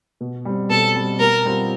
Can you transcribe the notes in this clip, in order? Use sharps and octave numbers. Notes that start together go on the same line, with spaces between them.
B2
G3 C4
B2 A4
G3 C4
B2 A#4
G3 C4 F4